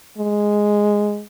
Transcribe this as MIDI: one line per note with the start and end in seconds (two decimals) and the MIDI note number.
0.18 1.23 56